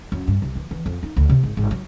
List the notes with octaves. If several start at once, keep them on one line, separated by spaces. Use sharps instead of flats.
F#2
G2
C2
E3
E3
F2
D#4
D2
C3
G#1
G#1
F#3